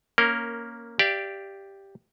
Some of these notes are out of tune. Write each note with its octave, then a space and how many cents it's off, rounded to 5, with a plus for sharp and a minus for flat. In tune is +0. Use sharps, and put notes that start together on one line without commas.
A#3 +0 C#4 +0 A#4 -10
G4 +0 D5 +0 F5 -45